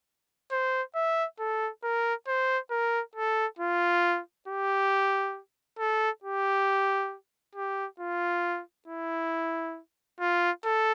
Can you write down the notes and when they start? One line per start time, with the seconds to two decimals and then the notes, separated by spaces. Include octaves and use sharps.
0.51 C5
0.95 E5
1.39 A4
1.83 A#4
2.28 C5
2.70 A#4
3.16 A4
3.59 F4
4.48 G4
5.79 A4
6.23 G4
7.55 G4
8.00 F4
8.88 E4
10.20 F4
10.64 A4